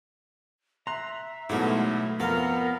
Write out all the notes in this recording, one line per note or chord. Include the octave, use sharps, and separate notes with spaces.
E5 A#5 C6 F#6
G#2 B2 F#3 A3 E4
F2 B3 A#4 F5